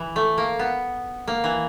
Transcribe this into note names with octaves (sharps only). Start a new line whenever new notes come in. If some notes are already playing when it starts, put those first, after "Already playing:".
Already playing: E3
A3
A#3
B3
A#3
E3